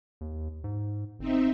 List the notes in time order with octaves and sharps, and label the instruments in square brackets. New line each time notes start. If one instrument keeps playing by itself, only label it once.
[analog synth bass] D#2
G#2
[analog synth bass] G1 [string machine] C4 D#4 E5